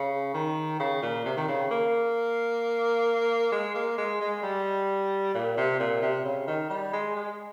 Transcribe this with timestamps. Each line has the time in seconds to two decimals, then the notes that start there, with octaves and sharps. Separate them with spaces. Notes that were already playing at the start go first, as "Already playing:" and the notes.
Already playing: C#3
0.34 D#3
0.80 C#3
1.02 A#2
1.25 C3
1.37 D#3
1.48 C#3
1.71 A#3
3.52 G#3
3.75 A#3
3.98 G#3
4.20 G#3
4.43 G3
5.34 A#2
5.57 C3
5.80 A#2
6.02 C3
6.25 C#3
6.47 D#3
6.70 G3
6.93 G#3
7.16 G#3